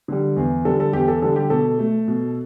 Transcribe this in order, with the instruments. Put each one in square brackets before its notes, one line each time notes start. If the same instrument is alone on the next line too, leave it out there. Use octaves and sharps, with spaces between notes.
[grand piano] D3 G3
E2
D3 G3 A4
A4
E2 G4
A4
D3 G3 A4
G4
B2 A4
A3
B2